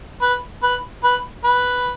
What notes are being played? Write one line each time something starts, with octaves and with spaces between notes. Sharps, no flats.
B4
B4
B4
B4